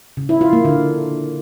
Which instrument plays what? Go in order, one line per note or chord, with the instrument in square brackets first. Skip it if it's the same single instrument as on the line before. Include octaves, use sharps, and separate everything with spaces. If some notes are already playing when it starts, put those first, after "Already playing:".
[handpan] C#3
E4
F4
A#3
D3